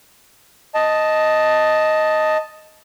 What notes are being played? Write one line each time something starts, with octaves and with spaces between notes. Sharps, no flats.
D#5 A5